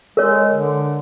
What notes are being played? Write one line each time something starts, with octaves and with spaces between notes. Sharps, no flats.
G#3 A#4 C#5
D3